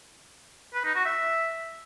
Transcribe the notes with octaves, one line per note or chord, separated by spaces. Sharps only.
B4
D#4
F#4
E5